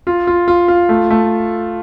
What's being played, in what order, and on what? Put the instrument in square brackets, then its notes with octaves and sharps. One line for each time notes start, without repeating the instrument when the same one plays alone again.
[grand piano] F4
F4
F4
F4
A3
A3